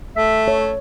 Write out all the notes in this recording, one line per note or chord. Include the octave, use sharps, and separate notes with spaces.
A3 E5
C#5